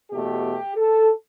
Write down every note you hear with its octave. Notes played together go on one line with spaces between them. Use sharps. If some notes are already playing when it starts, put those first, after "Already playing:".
E2 B2 A3 G4
A4